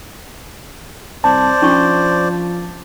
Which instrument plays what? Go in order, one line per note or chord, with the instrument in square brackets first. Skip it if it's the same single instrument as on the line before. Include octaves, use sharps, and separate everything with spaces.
[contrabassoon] C2 [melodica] C5 D5 [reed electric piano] A5
[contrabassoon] F3 [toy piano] C#4 D4 C#6